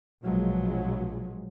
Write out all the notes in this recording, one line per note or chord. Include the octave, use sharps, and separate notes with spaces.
A#1 B2 F3 F#3 G#3